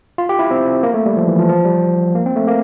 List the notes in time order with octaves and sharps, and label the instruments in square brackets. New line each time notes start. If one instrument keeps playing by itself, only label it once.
[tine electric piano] F4
G4
E4
C4
A#3
A3
G3
F3
E3
F3
F3
G3
A#3
C4
A3
A#3